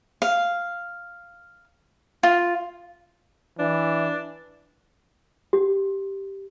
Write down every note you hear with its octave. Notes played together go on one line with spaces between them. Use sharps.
F5
F4
E3 D4
G4